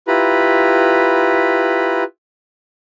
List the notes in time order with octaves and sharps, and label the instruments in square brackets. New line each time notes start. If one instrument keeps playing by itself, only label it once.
[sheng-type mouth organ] E4 F4 G4 B4 A#5 B5